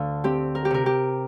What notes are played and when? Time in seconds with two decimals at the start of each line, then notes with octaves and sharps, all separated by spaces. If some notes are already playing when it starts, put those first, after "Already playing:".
Already playing: D2 D3 F5
0.24 C4 G4
0.55 A#4
0.65 G4
0.70 C3 A#4
0.86 G4